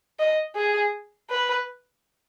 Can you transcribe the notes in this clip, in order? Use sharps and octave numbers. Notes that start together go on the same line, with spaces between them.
D#5
G#4
B4